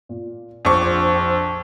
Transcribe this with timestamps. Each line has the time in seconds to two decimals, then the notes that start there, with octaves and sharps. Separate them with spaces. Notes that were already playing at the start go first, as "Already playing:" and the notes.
0.09 A#2
0.65 A#1 F2 C5 C#6 D6